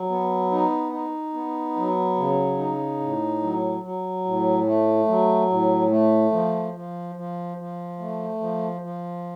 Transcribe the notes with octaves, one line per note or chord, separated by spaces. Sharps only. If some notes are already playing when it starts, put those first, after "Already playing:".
Already playing: F#3
B3
D#4
D#4
B3
F#3
C#3
D#4
A2
F#3
F#3
A2
A3
F#3
A2
A3
F3
F3
F3
F3
A3
F3
F3